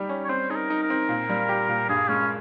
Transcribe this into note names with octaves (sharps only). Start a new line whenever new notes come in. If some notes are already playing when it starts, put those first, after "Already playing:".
Already playing: G3 D#4 G4
C#4
C#5
C4 C5
D#4 G#4
A#4
D#4
A#4
C4
A#2
G3
G4
A#2
G2 G#4
G#3 C#4